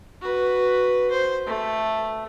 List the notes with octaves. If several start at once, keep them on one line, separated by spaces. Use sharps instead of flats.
F#4 B4
C5
A3